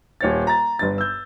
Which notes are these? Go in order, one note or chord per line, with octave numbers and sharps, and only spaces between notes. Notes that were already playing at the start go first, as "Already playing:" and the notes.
D#1 C#5 A6
A#5 A6
G1 G2 A6
E6 G6